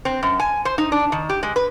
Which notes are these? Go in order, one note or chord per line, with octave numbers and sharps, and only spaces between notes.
C4
F#2
G#5
C5
D#4
D4
D#3
G4
G#3
B4